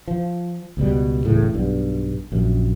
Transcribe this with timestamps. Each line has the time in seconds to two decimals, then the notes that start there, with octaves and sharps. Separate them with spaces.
0.08 F3
0.77 C#2 B2 G3
1.24 E1 C#2 A2 C#3
1.54 B1 G2
2.32 A#1 F#2